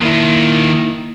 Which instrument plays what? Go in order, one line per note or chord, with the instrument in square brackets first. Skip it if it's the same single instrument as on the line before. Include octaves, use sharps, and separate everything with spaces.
[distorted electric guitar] D#3 F4 [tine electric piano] A#3 E4